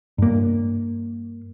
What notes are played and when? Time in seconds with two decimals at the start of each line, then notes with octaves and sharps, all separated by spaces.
0.18 G2 A#3